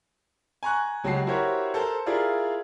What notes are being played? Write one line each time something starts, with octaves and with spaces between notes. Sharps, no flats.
G#5 A#5 C#6 F#6
C#2 F#3 F#4 G4 A5 C7
E4 F#4 G4 A#4 C5 C#5
A4 A#4 C5 A5
E4 F4 G#4 A#4 D5 F5